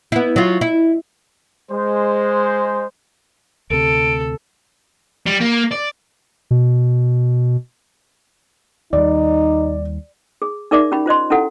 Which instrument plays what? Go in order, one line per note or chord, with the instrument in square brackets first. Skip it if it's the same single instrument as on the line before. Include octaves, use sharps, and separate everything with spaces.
[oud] B3 E4
F#3 F4
E4
[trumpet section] G#3 C5
[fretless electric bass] D2 C3 [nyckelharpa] A4 [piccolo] D7
[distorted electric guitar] G3
A#3
D5
[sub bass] B2
[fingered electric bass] D#2 G3 [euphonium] D#4 [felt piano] D5
[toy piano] G#4
D#4 G#4 A#4 D5 E5 D6
C#4 G4 B5
F4 C5 D#5 C6
C#4 E4 G4 A4 F#5